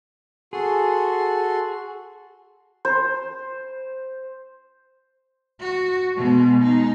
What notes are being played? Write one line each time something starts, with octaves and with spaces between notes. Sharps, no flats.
F#4 G#4 A4 C6
C5
F#4
B2 G#3
G#3 D#4